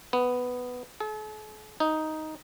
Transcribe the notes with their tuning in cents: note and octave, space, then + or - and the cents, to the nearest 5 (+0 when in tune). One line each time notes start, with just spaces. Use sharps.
B3 +5
A4 -45
D#4 +5